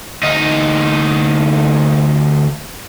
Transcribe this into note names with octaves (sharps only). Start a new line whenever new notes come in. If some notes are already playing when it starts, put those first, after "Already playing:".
D2 D#4